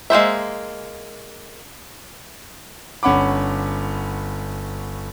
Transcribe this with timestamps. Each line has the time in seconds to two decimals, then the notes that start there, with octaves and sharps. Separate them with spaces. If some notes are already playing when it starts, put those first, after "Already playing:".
0.10 G#3 A#3 C5 E5
3.03 G1 C#4 F#5 B5 D6